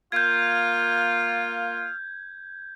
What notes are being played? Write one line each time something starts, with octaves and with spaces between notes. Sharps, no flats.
A#3 F4 F6 G6 G#6